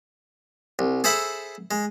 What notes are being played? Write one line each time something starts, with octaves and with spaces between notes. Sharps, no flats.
C2
G#4 A4 C5 E5 F#5 B5
G#3